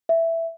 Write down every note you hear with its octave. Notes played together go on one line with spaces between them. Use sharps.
E5